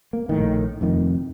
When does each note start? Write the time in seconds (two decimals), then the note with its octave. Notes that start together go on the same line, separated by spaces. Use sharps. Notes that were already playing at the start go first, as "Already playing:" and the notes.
0.13 A#3
0.29 A#1 A2 D#3
0.81 F1 F2 D#3